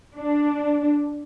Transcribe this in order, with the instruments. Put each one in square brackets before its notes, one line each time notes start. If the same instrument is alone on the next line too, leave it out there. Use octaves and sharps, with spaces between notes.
[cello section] D4